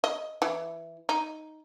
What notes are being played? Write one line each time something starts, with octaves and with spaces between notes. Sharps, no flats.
D#5
E3
D#4